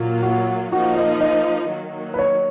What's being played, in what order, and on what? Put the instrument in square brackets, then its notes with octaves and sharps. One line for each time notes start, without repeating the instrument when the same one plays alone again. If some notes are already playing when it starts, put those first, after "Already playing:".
Already playing: [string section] A#2 F#3 A#3 F4
[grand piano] F#4
[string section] F3 A#3 D#4 [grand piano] F#4
[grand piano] D#5
D#5
[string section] D#3 F#3 A#3
[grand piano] B4
C#5